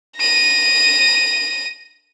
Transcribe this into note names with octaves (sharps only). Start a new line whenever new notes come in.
A#6 D#7